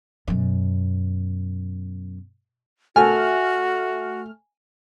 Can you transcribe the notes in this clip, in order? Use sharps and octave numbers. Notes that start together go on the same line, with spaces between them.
F#2 B2
A3 F#4 G#5 F6